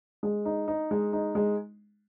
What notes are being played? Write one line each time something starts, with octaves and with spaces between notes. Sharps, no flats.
G#3
D#4
D#4
G#3
D#4
G#3